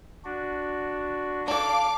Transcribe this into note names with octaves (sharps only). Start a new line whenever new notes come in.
D4 F#4
D4 A4 F5 D6